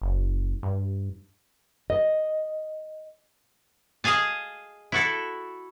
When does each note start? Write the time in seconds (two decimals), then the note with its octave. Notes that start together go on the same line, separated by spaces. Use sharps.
0.02 F#1
0.63 G2
1.90 D#5
4.04 G#4 D#5 F5 G#5 A5
4.92 E4 F#4 A4